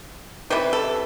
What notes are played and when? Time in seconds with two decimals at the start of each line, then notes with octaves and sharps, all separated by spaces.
0.50 C3 E3 G3 B4
0.73 A4